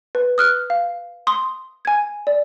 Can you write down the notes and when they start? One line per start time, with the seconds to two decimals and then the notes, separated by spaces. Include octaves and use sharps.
0.15 B4
0.38 D#6 F6 F#6
0.70 F5
1.27 C6 D#6
1.85 G#5 G#6
2.27 D5